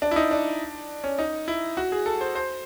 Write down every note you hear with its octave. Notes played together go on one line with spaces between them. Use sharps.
D4
E4
D#4
D4
C#4
D#4
E4
F#4
G#4
A4
C5
C5